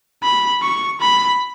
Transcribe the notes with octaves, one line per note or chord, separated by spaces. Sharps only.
B5
C#6
B5